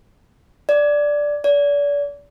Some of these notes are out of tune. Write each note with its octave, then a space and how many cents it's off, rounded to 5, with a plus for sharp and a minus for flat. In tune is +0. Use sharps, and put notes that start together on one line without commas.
D5 +0
D5 -35